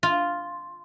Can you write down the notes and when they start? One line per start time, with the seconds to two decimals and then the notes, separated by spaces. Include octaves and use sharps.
0.03 F4